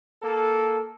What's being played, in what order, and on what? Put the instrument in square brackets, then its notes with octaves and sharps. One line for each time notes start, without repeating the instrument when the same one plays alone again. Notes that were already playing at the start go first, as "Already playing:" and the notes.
[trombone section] A#3 A4